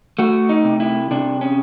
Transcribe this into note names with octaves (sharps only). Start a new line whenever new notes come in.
A3 F#4
D#4
C3
E4
C3 D4
C#4